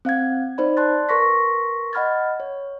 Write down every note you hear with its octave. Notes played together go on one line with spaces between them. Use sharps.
C4 F5 F#5 G#6
D#4 C5 D5 B5
D5 A5 C6 F#6 A6
A#4 B4 C6 C#6 A#6 B6
D#5 F#5 B5 F6 G#6 A6
C#5